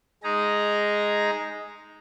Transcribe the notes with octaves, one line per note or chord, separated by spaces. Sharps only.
G#3 D#4 G#4 A#5